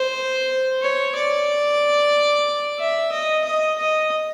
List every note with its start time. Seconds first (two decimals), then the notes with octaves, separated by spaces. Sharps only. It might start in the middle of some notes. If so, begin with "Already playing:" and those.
Already playing: C5
0.82 C#5
1.15 D5
2.79 E5
3.12 D#5
3.44 D#5
3.78 D#5